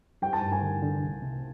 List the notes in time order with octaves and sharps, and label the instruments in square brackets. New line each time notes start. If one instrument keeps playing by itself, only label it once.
[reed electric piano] G3 [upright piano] G5
[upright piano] A5
[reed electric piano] G2
[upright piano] G#5
[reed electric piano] D3
D3
C2
C3